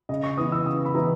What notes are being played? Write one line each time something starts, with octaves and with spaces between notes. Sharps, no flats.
C#3 D#5
C#6
E3 B3 E4 D#6
E6
C#3 D#6
B5
E3 B3 E4 A#5